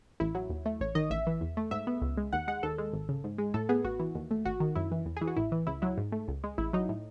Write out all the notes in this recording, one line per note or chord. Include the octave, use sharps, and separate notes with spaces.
A1 E4
F#3
D#2
A3
A1 C#5
D#3 D#5
A1 E5
E3
E2
A3
G#2 E5
B3
C#2
G#3
D#2 F#5
G#3 F#5
D#2 A4
G#3
G#1
C#3
G#2
G#3
A2 A4
B3 G#4
A1 F#4
E3
D#2
A3
G#1 F#4
D#3
F#2 E4
E3
E2
G#4
E3
F#4
A1 E4
E3
C#2 E4
F#3 E4
G#2
A3
C#2
G#3
A1 E4
F#3 D#4
A2